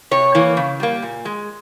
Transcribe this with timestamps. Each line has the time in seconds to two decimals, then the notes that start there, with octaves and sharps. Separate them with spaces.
0.11 C3 C#5
0.35 E3 A#3
0.57 C#3
0.80 G3 A#3
1.02 A#2
1.25 G#3